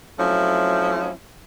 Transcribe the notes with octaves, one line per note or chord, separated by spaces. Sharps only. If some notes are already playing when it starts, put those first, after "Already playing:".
F3 F#3 A3 C4 C#4 E4